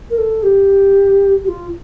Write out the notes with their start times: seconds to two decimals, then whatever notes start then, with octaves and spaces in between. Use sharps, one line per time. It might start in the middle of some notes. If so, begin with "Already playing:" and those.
0.10 A#4
0.18 A4
0.43 G4
1.44 G4
1.48 F4